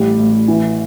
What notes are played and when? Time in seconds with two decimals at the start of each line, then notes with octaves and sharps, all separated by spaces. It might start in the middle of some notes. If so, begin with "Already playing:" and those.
Already playing: A1 G3
0.19 A1
0.48 E3